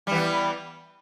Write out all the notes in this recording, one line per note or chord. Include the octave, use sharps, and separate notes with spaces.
E3 G3 B3